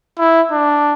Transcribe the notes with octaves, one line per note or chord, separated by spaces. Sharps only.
E4
D4